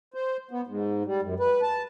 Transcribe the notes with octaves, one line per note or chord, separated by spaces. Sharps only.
C5
B3
G#2
G3
F#2
B4
A5